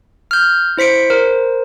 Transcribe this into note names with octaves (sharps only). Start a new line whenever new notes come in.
F6 G6
E4 C5 B6 C#7 D7
A#4 C5